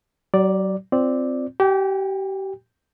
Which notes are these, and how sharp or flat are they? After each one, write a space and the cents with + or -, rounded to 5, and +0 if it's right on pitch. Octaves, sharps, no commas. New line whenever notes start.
F#3 +40 D5 +0
C4 -5 F4 +0 D5 +0
G4 -30 G5 +35